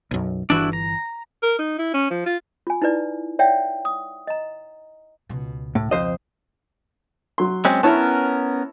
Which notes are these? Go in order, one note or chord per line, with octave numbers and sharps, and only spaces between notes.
B1 F#2
G1 E3 D4 E4 F#4
A#5
A#4
D#4
E4
C#4
F3
F4
F4 G#5
D#4 E4 B4 D5
C#5 D5 E5 F#5 G5
D#6
D#5 A#5
C#2 B2
A2
F2 C5 D#5
F#3 C6
G#3 C4 C#4
B3 C#4 E4 A#4 C#5 A5